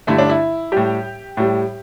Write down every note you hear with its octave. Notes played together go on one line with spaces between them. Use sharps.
G2 D3 A3 E4
D4
E4
A2 G3 G4
A2 G3